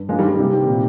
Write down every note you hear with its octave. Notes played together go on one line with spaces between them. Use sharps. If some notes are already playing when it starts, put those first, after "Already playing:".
Already playing: G2
F3 G#3 A#3
D#3 G3
A#3
C3 D#3 G3
C4
A#2